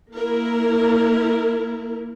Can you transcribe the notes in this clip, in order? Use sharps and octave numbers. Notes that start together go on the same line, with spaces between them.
A#3 E4 A#4